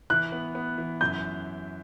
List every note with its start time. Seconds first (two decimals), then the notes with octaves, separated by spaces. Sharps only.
0.10 E3 F#6
0.32 B3
0.55 B3
0.78 E3
1.01 F#2 G6